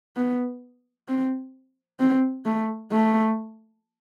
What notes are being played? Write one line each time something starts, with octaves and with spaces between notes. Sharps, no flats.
B3
C4
C4
A3
A3